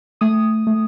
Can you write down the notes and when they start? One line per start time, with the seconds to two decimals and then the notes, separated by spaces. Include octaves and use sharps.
0.21 A3 D#6
0.67 A3